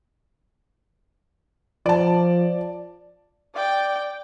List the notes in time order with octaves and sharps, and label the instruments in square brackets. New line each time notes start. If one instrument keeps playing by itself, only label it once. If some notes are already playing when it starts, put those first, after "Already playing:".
[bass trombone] F3 [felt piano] D5 A5
[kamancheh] D5 G5